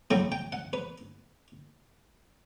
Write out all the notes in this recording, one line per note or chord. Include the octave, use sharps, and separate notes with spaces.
A2 F#3 A3 E4 G5
G5
F#5
B4